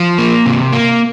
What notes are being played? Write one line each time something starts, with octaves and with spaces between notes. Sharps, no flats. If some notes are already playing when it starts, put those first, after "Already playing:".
Already playing: F3
A#3
C3
A#3